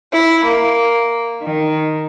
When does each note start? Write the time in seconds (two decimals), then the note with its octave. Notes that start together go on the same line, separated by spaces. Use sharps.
0.12 E4
0.44 A#3
1.43 D#3